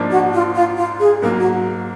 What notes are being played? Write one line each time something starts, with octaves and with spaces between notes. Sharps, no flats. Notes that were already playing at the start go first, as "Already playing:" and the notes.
Already playing: G#2 F3 A#3 D4
F#4
F4
F4
F4
G#4
G#2 F#3 A#3 A#4
F#4